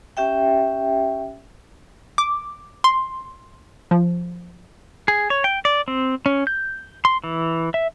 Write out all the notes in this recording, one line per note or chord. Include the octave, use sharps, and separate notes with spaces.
C#4 G4 E5 G5
D6
C6
F3
G#4
C#5
G5
D5
C4
C#4
G6
C6
E3
E5